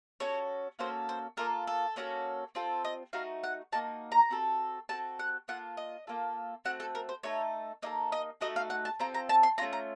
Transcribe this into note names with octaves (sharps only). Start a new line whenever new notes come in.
C#4 F#4 A4 C#5
A#3 C#4 F#4 A4 C5
C5
A#3 F4 A4 A#4
A4
A#3 C#4 F#4 A4
C4 F4 A4
D#5
A3 D#4 F#4 F5
F#5
A#3 D#4 F#4 A5
A#5
C4 F#4 A4
C4 F#4 A4 A5
F#5
A#3 F4 A4 F#5
D#5
A#3 F4 A4
A3 C4 F#4 F#5
A4
A#4
C5
A3 D#4 A4 C#5
A#3 D#4 A4 D#5
D#5
A3 D#4 F#4 A4 D#5
F5
F#5
A5
C4 F4 A4 A#5
A#5
A5
C6
A3 C#4 F4 A#5
A#5